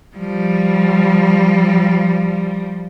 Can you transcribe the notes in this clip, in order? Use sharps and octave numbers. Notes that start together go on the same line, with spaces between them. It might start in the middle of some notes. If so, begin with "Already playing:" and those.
F3 G3